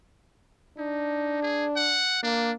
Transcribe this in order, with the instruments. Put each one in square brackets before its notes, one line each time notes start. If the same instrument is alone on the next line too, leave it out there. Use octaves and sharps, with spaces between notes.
[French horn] D4 [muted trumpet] D#4
[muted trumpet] G#4
F#5
[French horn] A#3 [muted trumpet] D4